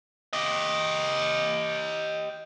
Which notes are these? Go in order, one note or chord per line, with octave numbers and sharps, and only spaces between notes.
G4 D#5